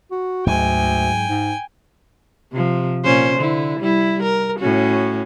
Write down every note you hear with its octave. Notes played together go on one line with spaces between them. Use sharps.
F#4
D2 G#2 F#3 G#3 G5 G#5
G#2
C3 F3
A#2 C#4 C5
D3 E4
G3 E4
A#4
A2 C#4 F#4